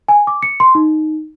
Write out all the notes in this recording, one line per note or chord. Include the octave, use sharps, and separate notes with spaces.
G#5
D6
C#7
C6
D#4